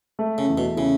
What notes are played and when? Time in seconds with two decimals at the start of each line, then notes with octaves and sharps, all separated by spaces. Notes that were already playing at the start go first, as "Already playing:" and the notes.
0.19 A3
0.38 C#3
0.48 E2
0.58 B2
0.77 C#3 E4